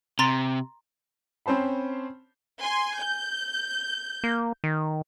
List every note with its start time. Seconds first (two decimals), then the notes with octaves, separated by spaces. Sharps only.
0.19 C3 A#5 C6 A6
1.46 C4 C#4 C5 A5 B5
2.62 G#5 C6
2.98 G6
4.24 A#3
4.64 D#3